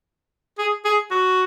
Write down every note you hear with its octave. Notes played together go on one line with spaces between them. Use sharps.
G#4
G#4
F#4